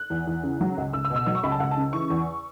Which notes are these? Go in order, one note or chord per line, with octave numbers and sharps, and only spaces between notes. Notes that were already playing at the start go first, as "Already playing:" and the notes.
Already playing: F#6
E2
E2
C#3
F#3
C#2
C#2 E6
E6
B2
E6
F#3 E6
C#6
C#2 B5
A5
C#2 F#5
A5
C#3
E3 C#6
E2